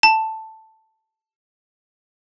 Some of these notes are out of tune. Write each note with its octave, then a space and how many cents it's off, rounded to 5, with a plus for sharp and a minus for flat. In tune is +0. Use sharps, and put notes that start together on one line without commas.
A5 +5